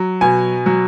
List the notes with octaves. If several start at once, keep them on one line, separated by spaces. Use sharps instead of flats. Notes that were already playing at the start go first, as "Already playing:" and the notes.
Already playing: F#3
B2 G#5
F#3